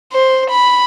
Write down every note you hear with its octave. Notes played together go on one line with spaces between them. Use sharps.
C5
B5